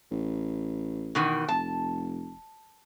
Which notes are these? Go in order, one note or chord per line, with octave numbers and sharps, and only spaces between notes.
A1
B2 D#3 E3
F1 A5